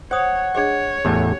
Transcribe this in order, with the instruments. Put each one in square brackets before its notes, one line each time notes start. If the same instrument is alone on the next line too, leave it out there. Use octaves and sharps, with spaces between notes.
[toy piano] C5 D#6 [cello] C#5 [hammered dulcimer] F#5
[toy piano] D4 G#4 D#5 [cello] C#5
[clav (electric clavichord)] E2 A2 A3 [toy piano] G4